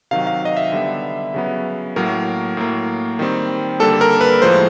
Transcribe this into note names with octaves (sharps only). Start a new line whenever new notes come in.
C3 D#3 F#3 F5
F5
D#5
E5
D3 G3 B3
C#3 F#3 B3
A2 F#3 A#3 A#4
A2 F#3 A#3
D#3 G3 C4
D3 G3 A#3 A4
A#4
B4
A2 F3 G#3 C5